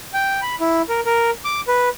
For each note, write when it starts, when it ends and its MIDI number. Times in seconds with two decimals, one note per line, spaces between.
0.14 0.41 79
0.42 0.55 83
0.60 0.82 64
0.89 1.00 70
1.06 1.31 70
1.45 1.61 86
1.68 1.89 71